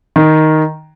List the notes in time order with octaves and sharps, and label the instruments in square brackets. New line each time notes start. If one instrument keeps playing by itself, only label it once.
[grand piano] D#3